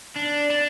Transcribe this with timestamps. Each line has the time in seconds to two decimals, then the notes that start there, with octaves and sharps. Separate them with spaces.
0.16 D4
0.50 D4